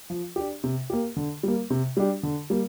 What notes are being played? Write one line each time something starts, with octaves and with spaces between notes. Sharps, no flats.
F3
D4 G4
C3
A#3 G4
D3
G3 A#3
C3
G3 D4 G4
D3
G3 A#3